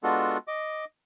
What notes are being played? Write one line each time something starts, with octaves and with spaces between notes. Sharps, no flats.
G#3 B3 D4 F4 F#4 A4
D#5 D6